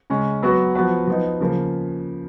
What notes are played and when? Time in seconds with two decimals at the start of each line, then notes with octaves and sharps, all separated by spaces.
0.10 C#3 G#3 C#4
0.43 F#3 B3 F#4
0.75 F3 B3 F#4 B4
1.07 F3 B3 D#4
1.40 C#3 F3 A#3